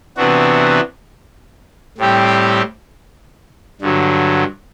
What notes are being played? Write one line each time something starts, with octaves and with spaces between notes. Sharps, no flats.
C3 E3 B3 D4 F#4
A2 G3 C4 G4
G2 D3 F#3